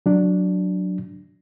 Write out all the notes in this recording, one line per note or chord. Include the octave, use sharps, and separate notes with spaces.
F#3 D4